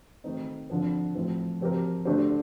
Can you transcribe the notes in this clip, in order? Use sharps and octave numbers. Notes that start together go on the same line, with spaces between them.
D#3 A3 C4 D#4
D3 F3 C4
A2 F3 C4
F3 C4 G4 A#4
D3 A3 D4 G4 C5